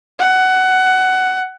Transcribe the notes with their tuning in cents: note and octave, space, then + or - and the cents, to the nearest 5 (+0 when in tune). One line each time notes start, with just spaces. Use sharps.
F#5 +15